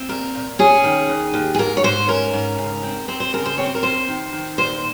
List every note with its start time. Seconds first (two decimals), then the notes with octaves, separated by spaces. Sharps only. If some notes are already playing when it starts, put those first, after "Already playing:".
Already playing: C4
0.09 A#2 A#4
0.35 A#2
0.59 C#4 G#4
0.84 D#3
1.08 D#2
1.34 D#2
1.55 G#4
1.59 G#2 A#4
1.77 C#5
1.84 G#2 C5
2.08 C#4 A#4
2.33 G#2
2.58 C#3
2.83 C4
3.08 C4 C5
3.20 C5
3.33 C#3 A#4
3.46 C5
3.58 C4 C#5
3.66 C5
3.75 A#4
3.83 F2 C5
4.08 D#3
4.33 D#3
4.58 A#2 C5